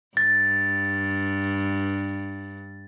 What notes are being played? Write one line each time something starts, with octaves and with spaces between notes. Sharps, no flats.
G2 A6